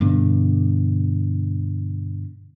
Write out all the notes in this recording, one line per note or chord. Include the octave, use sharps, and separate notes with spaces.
G2 B2 D3